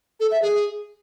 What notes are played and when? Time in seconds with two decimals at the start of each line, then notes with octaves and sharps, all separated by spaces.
0.20 A4
0.31 E5
0.42 G#4